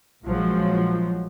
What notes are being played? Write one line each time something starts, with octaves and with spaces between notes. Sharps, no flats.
A#1 F3 F#3 G#3